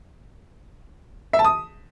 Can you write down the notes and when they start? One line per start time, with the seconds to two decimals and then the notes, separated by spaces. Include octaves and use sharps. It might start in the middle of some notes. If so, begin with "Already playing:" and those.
1.33 E5
1.39 A5
1.44 D#6